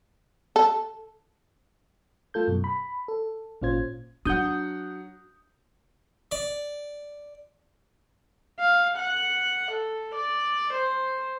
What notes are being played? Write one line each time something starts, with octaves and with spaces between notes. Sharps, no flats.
A4
A3 F4 A4 G6
F#2 B2
B5
A4
G#1 A#2 C#4 F4 C5 G#6
F#3 D4 F#5 D#6 G6
D5
F5
F#5
A4
D5
C5